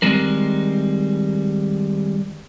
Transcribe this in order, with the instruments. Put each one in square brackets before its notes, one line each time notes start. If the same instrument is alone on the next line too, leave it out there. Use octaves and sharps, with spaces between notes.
[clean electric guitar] D#3 G3 G#3 C4 A#4